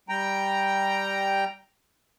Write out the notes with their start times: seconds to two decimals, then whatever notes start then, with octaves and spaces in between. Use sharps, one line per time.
0.09 G3 G5 A#5